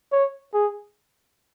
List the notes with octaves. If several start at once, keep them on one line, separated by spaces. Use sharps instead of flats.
C#5
G#4